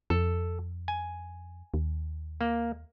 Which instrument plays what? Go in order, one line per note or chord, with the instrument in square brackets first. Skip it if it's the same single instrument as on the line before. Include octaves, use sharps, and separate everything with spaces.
[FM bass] F2 [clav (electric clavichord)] A4
[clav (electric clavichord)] G#5
[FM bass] D#2
[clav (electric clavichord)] A#3